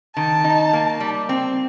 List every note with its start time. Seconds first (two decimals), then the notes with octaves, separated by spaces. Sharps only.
0.16 D#3 A5
0.44 D#4
0.73 A#3
1.00 G3
1.29 C4